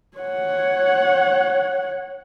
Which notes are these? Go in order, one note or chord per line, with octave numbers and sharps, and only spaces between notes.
C#5 F#5